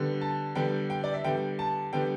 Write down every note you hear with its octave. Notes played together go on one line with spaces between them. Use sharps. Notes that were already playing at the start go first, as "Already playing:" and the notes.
Already playing: D3 G3 B3
A5
D3 G3 B3 G5
G5
D5
E5
D3 G3 B3 G5
A5
D3 G3 B3 G5